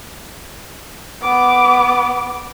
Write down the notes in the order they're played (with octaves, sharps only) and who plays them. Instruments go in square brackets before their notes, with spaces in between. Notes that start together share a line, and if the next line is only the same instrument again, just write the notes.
[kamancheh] B3 D6